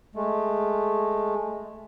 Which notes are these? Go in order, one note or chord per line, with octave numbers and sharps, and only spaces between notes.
G#3 A3